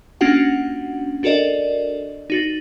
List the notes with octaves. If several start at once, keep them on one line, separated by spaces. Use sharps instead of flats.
A#3 C#4 D4 F4 F#4 F#5
D4 F#4 A4 A#4 D5 D#5
D#4 F#4 A6